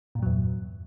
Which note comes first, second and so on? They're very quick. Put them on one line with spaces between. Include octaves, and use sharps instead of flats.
A#2 G2 F#3 E2